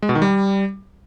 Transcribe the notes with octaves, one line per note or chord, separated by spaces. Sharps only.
G#3
B2
D#3
G3